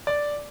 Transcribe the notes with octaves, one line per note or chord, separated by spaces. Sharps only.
D5